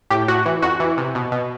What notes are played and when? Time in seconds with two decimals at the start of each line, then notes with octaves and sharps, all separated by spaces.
0.10 A2 G4
0.28 A2 F#4
0.46 E3
0.62 F2 F#4
0.80 E3
0.97 C3
1.15 B2
1.32 B2